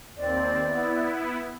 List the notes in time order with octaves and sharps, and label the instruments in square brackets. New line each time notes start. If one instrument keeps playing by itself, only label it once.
[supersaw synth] D#2 C4 [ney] D5
[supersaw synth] B3 E4